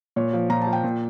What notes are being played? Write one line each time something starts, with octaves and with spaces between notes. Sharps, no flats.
A#2 C#5
F3
A#2 A#5
A5
F3
G5
A#2